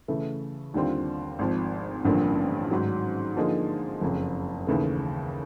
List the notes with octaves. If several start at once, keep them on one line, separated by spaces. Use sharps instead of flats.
C#3 E3 A3
D#2 D3 G3 C4 F4
G#1 G#2 F3
A1 G2 D3 F3 A#3
G#2 D#3 F#3
D3 F3 A#3 D#4 G#4
F#1 F2 C#3
D#2 C#3 E3 A3